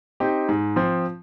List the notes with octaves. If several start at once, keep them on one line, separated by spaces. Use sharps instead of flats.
C4 D#4 G4
G#2
F3 C4